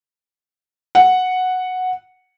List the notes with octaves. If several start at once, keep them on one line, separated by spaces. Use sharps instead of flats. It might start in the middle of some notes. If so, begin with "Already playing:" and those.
F#5